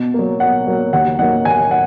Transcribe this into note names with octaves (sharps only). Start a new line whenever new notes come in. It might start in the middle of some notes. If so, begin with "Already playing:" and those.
Already playing: B2
F#3 A#3
B2 F#5
F#3 A#3
D#2 F#5
D#3 F#3 A#3 F#5
D#2 G#5
F#5